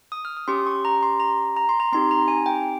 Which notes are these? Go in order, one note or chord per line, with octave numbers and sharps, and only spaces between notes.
D#6
F6
D#6
C#4 G4 C6
C#6
A#5
C6
A#5
A#5
C6
A#5
C4 D#4 G4 C6
A#5
G#5
G5